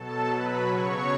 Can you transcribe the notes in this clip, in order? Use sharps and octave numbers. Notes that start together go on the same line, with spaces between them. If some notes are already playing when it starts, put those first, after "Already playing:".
Already playing: B2 F#3 A4 A5
B2 F#3 B4 B5
C#3 F#3 C#5 C#6